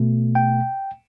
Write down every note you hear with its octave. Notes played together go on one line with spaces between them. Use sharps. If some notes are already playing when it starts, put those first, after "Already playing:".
Already playing: B2 A3
G5